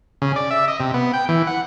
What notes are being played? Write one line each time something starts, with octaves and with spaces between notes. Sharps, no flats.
C#3
D5
E5
D#5
C3
B3
G5
E3
F#5